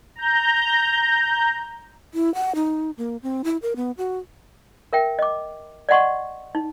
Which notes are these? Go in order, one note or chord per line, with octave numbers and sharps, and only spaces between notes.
A#5 G6
E4
F#5
D#4
A#3
C4
E4
A#4
B3
F#4
A#4 E5 G5
D#5 D6
D5 D#5 F#5 C6 C#6
D#4